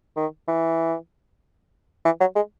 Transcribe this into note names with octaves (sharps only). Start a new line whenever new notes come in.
D#3
E3
E3
F#3
G#3